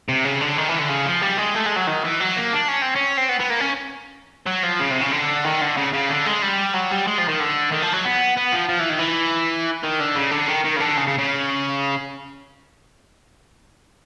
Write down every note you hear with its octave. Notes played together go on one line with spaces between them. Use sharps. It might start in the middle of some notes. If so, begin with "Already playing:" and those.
C3
C#3
D3
D#3
E3
D3
C#3
F3
G3
G#3
A3
G#3
F#3
D#3
E3
F#3
A#3
D4
C#4
C4
C#4
C4
B3
B3
A#3
C#4
F#3
F3
C#3
C3
C#3
D3
D#3
D3
C#3
C#3
D3
G#3
G3
F#3
G3
G#3
F3
D#3
D3
D#3
F3
F#3
B3
B3
F3
F3
E3
D#3
E3
D#3
D3
C#3
D3
D#3
D#3
C#3
D3
C#3
C#3
C#3